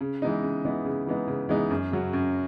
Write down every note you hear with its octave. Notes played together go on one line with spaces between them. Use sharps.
C#3
E3 G#3 B3 D#4
C#3
E3 G#3 B3 D#4
C#3
E3 G#3 B3 D#4
C#3
E3 G#3 B3 D#4
F#2
C#3 F#3
F#2